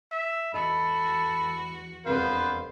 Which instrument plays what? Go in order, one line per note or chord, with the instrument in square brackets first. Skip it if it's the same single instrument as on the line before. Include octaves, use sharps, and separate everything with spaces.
[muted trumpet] E5
[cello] E2 F#4 [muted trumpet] A4 [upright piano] D#5 [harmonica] B5
[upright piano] E1 F2 [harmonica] B3 B4 F5 [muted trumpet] C5